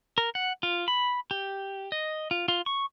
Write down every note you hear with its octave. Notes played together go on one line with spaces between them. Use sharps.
A#4
F#5
F4
B5
G4
D#5
F4
F4
C#6